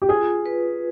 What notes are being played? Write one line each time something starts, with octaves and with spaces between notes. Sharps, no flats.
G4
F4 G#4
B4